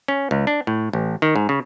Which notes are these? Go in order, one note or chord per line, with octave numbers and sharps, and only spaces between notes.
C#4
C#2
D4
A2
A1
D#3
G#2
C#3